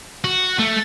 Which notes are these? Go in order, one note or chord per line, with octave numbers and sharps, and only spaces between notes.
F#4
A3